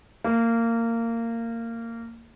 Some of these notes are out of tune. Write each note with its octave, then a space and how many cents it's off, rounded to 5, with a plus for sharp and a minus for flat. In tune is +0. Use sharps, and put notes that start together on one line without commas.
A#3 -20